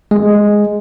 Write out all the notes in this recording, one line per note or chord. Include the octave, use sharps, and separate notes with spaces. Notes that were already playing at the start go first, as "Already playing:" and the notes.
G#3